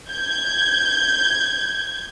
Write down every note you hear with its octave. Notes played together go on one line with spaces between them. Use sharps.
G6 G#6